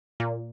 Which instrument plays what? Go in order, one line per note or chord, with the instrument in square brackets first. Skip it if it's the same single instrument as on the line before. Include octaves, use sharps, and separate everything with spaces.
[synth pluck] A#2